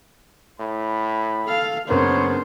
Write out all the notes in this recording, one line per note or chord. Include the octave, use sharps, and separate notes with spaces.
A2 B5
A4 F5
F#1 B3 C4 D4 A#4 C5 C#5